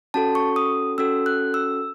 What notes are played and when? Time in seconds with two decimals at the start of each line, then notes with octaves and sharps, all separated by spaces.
0.14 C#4 F#4 A4 A5
0.35 C#6
0.56 D#6
0.98 C#4 F#4 A4 E6
1.26 F#6
1.54 E6